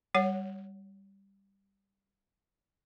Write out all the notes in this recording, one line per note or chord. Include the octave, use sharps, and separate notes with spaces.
G3 C#5 F#5